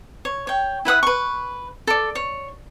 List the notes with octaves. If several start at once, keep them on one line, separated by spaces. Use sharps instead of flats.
C#5
C#5 G5
E4 B4 F#5 D#6
B4 C#6
A4 D5
C#5